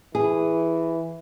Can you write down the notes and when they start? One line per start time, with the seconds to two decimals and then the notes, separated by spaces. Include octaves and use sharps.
0.15 E3 G#4